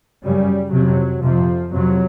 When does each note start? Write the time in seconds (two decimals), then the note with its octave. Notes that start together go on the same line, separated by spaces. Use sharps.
0.23 F#2 C#3 G3
0.73 F2 C3 F#3
1.23 F2 C3 F3
1.72 F2 C3 F#3